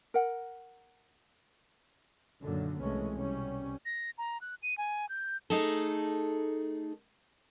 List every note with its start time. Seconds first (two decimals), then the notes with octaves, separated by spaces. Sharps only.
0.14 A#4 F#5
2.42 F#2 A#2 D3 D#3 F#3 A#3
2.79 C2 B2 E3 G#3 A3 C#4
3.14 C2 B2 G3 C#4
3.85 A#6
4.18 A#5
4.41 F#6
4.63 D#7
4.78 G#5
5.09 G6
5.50 A3 D#4 G#4 A4